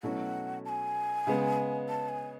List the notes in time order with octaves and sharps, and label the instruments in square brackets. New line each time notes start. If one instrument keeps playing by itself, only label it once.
[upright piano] B2 F#3 A3 C#4 E4 [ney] F#5
[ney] A5
G#5
[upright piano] C#3 G#3 B3
[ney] A5
G#5